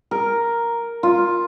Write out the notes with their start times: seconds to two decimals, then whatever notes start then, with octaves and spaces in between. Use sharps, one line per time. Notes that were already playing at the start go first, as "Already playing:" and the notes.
0.11 A#4
1.03 F4